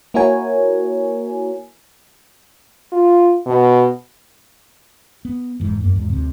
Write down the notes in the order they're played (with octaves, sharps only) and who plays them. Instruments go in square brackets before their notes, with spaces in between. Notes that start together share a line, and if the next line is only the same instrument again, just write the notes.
[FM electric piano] A#3 E4 F#4 A#4 C#5 G#5
[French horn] F4
B2
[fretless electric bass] B3
F1 C2 G#2 E3
F#2 A#3
E2 G#2
D2 C3